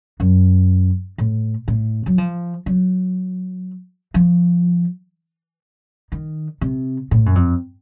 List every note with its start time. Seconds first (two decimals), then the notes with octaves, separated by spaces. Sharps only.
0.20 F#2
1.18 A2
1.68 A2
2.06 F#3
2.18 F3
2.66 F#3
4.14 F3
6.12 D#3
6.61 C3
7.11 A2
7.26 F#2
7.35 F2